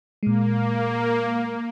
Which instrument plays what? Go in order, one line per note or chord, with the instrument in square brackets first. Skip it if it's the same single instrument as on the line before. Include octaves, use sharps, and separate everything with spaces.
[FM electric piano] A#2 G#3 [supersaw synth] A#3